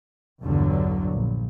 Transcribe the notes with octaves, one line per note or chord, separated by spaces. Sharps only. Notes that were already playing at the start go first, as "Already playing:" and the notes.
B1 E2 G2 D3 F#3
A#1